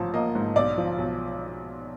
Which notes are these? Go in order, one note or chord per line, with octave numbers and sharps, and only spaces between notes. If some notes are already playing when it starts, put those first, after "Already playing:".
Already playing: A1 G#2 F3 A5
A#3 D#5
G#2
B1 D5
F3
B1